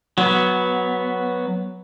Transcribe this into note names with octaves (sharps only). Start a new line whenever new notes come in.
F#3 B3